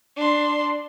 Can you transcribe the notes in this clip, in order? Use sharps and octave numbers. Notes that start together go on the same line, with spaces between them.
D4 C6